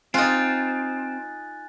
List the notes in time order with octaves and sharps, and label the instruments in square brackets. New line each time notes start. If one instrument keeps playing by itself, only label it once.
[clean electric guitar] C4 [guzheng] D#4 F4 [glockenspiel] G#5 F#6 A6